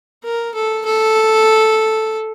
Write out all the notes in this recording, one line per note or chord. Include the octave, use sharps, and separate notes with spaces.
A#4
A4
A4